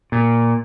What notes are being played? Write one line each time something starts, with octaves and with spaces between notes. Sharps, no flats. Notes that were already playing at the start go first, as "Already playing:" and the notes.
A#2